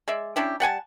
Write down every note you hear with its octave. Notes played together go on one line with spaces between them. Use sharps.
G#3 D5 E5
C#4 D4 E4 G4
G3 F#5 G#5 A5